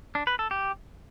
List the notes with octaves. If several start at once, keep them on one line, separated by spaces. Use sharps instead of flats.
D4
B4
A4
G4